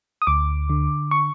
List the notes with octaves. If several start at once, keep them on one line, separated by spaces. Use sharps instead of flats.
D#6
D2 D6
D3
C#6